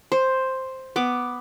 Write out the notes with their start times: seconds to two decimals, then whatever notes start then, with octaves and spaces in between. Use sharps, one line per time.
0.12 C5
0.96 B3 D6